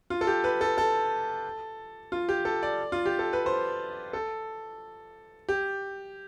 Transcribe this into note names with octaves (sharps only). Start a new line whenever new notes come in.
F4
A4
G4
B4
A4
A4
F4
G4
A4
D5
F4
G4
A4
B4
C5
A4
G4